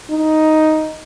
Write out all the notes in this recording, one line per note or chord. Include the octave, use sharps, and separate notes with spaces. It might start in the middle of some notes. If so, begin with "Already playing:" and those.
D#4